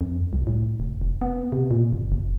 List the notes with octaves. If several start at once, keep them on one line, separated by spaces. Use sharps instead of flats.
F2
C2
A2
F1
F1
B3
C3
A#2
G1
F#1